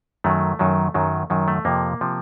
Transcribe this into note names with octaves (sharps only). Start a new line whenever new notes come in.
F#2 D#3 F#3 A3
F#2 D#3 F#3
F#2 D#3 F#3
F#2 D#3 F#3
A3
F2 C3 F3 A#3
C3 F3